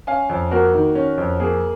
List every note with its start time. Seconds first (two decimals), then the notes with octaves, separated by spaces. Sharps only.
0.07 C#4 F5 G#5
0.29 F2
0.51 A#3 F#4 A#4
0.74 D#3
0.95 C#4
1.18 F2
1.40 A#3 G#4